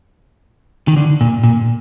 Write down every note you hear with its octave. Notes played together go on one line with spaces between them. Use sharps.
D#3
D3
A#2
A#2